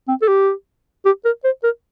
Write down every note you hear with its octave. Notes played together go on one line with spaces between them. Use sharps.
C4
A4
G4
G4
A#4
C5
A#4